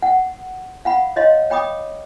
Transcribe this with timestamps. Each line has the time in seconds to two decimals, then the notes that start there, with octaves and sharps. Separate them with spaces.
0.02 F#5
0.85 F5 F#5 B5
1.16 C#5 D#5 F5 C6
1.50 C#5 G5 B5 D6 D#6